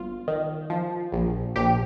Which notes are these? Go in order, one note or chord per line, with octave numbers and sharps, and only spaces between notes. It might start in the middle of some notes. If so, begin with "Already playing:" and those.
Already playing: G1 F4
D#3
F3
A#1
A#1 G4